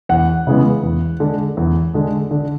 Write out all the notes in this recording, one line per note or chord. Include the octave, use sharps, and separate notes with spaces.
E2 F#5
C#3 E3 G#3 B3
E2
D3 G#3
E2
D3 G#3
D3